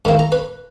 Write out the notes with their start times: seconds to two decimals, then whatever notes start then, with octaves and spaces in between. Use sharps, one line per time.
0.05 G#2 D#3 A#3 E4 B5
0.19 A#5
0.32 B4 B5